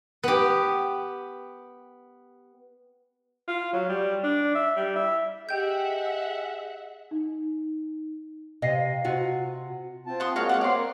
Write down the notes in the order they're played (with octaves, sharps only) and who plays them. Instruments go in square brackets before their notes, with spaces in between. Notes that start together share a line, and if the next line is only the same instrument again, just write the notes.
[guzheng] B3 G4
[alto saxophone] F4
F#3
G3
D4
E5
G3
E5
[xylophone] G4 G5 G6 [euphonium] G#4 [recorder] D#5 [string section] E5 F#5
[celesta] D#4
[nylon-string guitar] C3 D#5 [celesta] F5 A#6 C7
[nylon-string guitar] C3 F4 F#4 [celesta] F#5
[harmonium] C4 F4 A5
[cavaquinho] F#5 C6 D#6
[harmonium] G#3 A#3 [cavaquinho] F#4 C#5 F5
[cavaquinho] C#5 D5 F#5
[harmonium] B3 C4 C#5 [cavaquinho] D5 C6
[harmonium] A#4